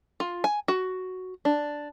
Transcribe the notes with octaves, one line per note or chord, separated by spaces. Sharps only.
F4
G#5
F#4
D4